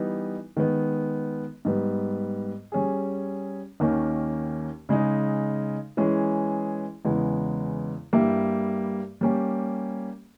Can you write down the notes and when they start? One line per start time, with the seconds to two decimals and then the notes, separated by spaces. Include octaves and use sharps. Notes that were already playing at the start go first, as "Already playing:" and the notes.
Already playing: E3 G3 B3 D#4
0.57 D#3 G#3 B3
1.65 G#2 G3 B3
2.72 G3 C#4 G#4
3.80 D#2 D#3 A#3 C#4
4.89 C#3 G#3 D#4
5.97 E3 G#3 C#4 G#4
7.05 E2 C#3 G#3 B3
8.13 G2 G3 A#3 E4 G4
9.21 G3 A#3 C#4 G4